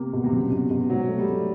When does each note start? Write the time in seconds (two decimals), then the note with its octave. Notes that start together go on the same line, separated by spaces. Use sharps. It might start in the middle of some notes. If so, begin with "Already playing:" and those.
Already playing: C3 A#3
0.13 B2
0.24 C3
0.32 C#3 F#3
0.52 B2
0.71 B2
0.89 G#2 F#3
1.08 A3
1.18 G3
1.28 A3